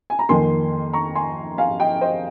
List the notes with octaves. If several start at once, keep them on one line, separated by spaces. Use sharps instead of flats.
G#5
A#5
F2 D#3 A#3 G#5 C6
A#5 C#6
G#5 C6
F5 G#5
D#5 G5
C5 D#5